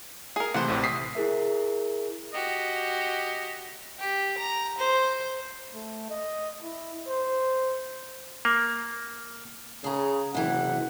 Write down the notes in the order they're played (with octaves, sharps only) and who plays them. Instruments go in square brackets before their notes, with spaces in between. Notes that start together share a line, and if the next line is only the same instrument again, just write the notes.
[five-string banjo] G#4 A#4
[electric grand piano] C3 E3 A3 [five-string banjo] C5 F#5
[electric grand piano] A#1 A2 C3
D#6 B6 C7
[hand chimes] E4 G#4 A#4 E5
[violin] F#4 G4 [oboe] D#5
[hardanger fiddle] G4
A#5
C5
[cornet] A3
D#5
E4
C5
[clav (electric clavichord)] A#3
[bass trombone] C#3 [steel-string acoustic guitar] G#4 A#5
[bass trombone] F#1 [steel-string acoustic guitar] C3 E3 [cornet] F#5